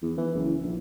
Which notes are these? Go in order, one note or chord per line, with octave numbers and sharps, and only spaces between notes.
E2
E3
F#1
A#1